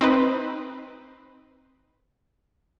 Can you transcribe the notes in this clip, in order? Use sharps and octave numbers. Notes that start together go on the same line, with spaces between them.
C4 D#4 B4